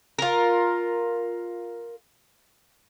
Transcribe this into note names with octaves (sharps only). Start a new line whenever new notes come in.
F4 A#4